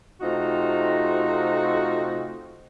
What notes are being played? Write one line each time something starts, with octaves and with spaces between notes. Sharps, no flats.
C3 A3 C4 D#4 F4 F#4